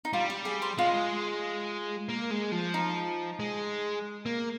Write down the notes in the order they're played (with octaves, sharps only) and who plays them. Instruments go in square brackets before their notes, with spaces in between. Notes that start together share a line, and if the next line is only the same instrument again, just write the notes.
[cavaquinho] D#4
[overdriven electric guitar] G3 [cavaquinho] F4
[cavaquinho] G4
G#4
C5
[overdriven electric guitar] G#3 [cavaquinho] F4
[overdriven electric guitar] A#3
G#3
F3
[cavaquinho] D#4
[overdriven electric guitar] G#3
A#3